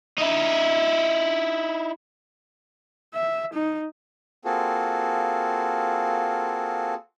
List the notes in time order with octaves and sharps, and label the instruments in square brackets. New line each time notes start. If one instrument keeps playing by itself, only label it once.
[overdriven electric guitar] D#4 E4
[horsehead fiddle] E5
D#4
[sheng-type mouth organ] A#3 C4 F4 F#4 G#4 A4